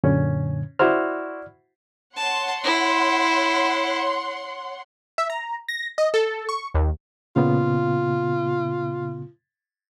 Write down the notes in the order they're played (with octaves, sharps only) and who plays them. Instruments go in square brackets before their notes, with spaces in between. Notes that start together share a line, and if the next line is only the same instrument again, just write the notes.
[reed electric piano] F#2 A#2 D3 [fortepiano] C#4
[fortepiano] E4 F#4 C5 [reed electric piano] D5 F6
[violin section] C#5 F#5 C6 [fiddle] A5
[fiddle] E4
[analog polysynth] E5
A#5
A#6
D#5
A4
C#6
D#2
[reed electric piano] A#2 C#3 B3 [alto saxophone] F4